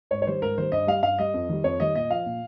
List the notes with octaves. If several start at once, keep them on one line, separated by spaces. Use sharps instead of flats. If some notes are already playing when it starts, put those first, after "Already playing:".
G#2 C#5
C#5
D#3 G3 C5
G#2 A#4
D#3 G3 C5
G2 D#5
G3 F5
G2 F5
G3 D#5
F2
D#3 G3
F2 C#5
D#3 G3 D#5
A#2 D#5
F3 F5
A#2